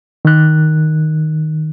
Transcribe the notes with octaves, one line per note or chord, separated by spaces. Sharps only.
D#3 F#6